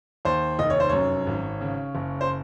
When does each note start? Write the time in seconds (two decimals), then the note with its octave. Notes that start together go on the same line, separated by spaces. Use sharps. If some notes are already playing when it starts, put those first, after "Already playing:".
0.25 D#2 C5
0.59 F1 D#5
0.70 C#5
0.80 C5
0.89 F#2 C#5
1.27 G#1
1.61 C#3
1.95 F#1
2.21 C5